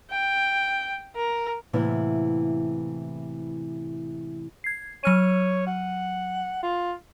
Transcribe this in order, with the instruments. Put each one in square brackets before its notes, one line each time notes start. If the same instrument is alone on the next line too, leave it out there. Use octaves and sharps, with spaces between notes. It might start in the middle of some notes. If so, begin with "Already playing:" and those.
[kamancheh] G5
A#4
[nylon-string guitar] A2 C3 E3 A#3 B3 E4
[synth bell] G#6 C7
[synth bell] F#3 F6 D#7 [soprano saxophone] C#5
[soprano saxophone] F#5
F4